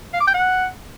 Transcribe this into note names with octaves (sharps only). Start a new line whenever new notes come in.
F5
D6
G5
F#5